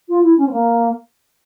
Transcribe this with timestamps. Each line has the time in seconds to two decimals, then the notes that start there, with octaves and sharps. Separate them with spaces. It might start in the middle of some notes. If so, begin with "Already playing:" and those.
0.09 F4
0.23 E4
0.37 C#4
0.46 C4
0.51 A#3